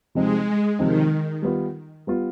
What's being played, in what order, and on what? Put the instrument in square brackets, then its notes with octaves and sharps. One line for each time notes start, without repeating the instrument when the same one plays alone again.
[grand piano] C3 F3 C4 D#4 [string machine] G#3
[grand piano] C3 F3 C4 D#4 [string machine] D#3
[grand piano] G3 B3 F4
G3 B3 F4